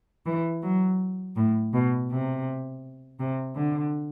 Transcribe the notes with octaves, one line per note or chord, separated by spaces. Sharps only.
E3
F#3
A2
B2
C3
C3
D3